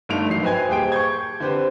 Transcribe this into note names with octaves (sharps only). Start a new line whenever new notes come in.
G1 G2 A3 D#4 D7 F7
G#1 F#3 C7
B4 C5 D#5 G5 G#5 G#6
D#1 G4 G#4 C5 G5 D7
C#6 G6 G#6
D3 C4 G4 B4 C5